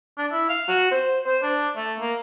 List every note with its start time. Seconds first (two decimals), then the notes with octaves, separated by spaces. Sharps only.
0.18 D4
0.32 E4
0.49 F5
0.68 F#4
0.91 C5
1.26 C5
1.43 D4
1.76 A3
2.00 A#3